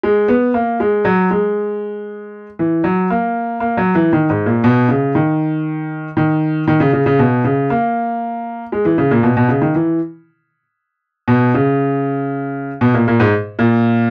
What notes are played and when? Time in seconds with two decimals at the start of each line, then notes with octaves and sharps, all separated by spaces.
0.03 G#3
0.28 B3
0.54 A#3
0.80 G#3
1.05 F#3
1.31 G#3
2.59 E3
2.84 F#3
3.10 A#3
3.60 A#3
3.77 F#3
3.95 E3
4.13 D#3
4.30 G#2
4.46 A#2
4.64 B2
4.89 C#3
5.15 D#3
6.17 D#3
6.67 D#3
6.80 C#3
6.93 C#3
7.06 C#3
7.19 B2
7.44 C#3
7.70 A#3
8.72 G#3
8.85 E3
8.98 C#3
9.11 A#2
9.23 B2
9.37 B2
9.49 C#3
9.62 D#3
9.75 E3
11.28 B2
11.54 C#3
12.81 B2
12.94 A#2
13.08 A#2
13.20 G#2
13.59 A#2